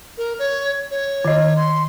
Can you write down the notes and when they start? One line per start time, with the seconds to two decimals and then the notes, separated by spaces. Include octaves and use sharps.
0.18 A#4
0.39 C#5
0.91 C#5
1.25 D#3 D#5
1.56 C6